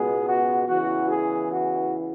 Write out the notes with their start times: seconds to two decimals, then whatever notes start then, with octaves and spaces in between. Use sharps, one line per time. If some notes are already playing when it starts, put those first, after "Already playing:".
Already playing: C#2 B2 G#3 B3 G#4
0.26 F#4
0.67 E2 C#3 E3 F#4
1.09 G#4
1.50 F#4